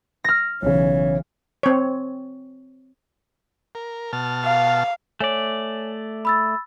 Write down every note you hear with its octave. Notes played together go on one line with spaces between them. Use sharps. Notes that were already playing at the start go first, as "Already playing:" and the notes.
F6 A#6
B1 C#3 E3 C#5
C4 C#5
A#4
B2 A5 F6
F5
A3 C#5 D5 G#5
B5 E6 A6